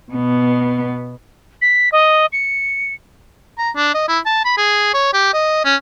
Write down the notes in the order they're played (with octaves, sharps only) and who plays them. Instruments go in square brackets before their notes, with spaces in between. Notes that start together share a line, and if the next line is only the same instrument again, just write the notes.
[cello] B2 B3
[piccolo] B6
D#5
C#7
[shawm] A#5
D4
D#5
E4
A5
B5
G#4
C#5
G4
D#5
C#4